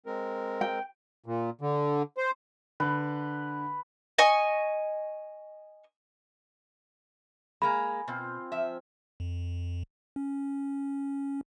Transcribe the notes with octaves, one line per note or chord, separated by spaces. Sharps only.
G#3 C4 A#4
G5
A#2
D3
C5
D3 B4
D#5 G#5 C#6
G#3 A#3 G#5 A#5 B5
B2 C4 F4 C5
F3 E5
F2
C#4